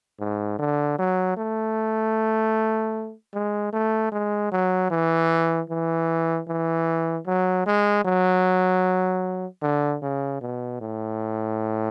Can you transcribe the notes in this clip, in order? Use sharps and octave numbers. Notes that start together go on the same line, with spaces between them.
G#2
D3
F#3
A3
G#3
A3
G#3
F#3
E3
E3
E3
F#3
G#3
F#3
D3
C#3
B2
A2